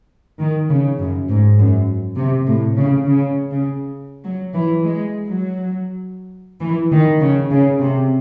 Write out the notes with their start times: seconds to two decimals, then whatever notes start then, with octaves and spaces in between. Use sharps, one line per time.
0.39 D#3
0.69 C#3
0.98 F#2
1.28 G#2
1.58 F#2
2.17 C3
2.47 A2
2.77 C#3
3.06 C#3
3.51 C#3
4.24 F#3
4.54 E3
4.84 G#3
5.28 F#3
6.61 E3
6.91 D#3
7.21 C#3
7.50 C#3
7.80 C3